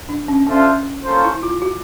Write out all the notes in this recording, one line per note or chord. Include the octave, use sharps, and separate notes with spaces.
D4
C#4
C#4 D4 F4 A4 C5 E5
A#3 C#4 F4 A4 C5
E4
F4
F#4